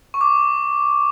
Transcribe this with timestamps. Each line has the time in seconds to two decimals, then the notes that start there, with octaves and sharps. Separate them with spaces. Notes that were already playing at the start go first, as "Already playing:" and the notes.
0.14 C#6
0.21 D6